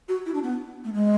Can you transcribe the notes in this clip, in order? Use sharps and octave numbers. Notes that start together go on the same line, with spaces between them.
F#4
E4
D4
B3
A3
G#3